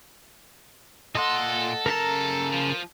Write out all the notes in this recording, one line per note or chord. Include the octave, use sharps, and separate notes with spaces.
A#2 A4 D#5 F#5 C6
C#3 A#4 A5 A#5
F3